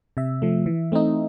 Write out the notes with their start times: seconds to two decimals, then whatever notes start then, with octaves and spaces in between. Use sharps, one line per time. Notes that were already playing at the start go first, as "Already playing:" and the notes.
0.17 C3 E5
0.42 F3 A3
0.66 E3
0.92 A3 C4 D#4